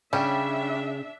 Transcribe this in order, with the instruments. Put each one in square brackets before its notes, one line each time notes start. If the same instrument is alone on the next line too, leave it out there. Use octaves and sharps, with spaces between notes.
[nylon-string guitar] C#3 G#4 G5 [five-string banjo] G3 C#4 [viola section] D4 E5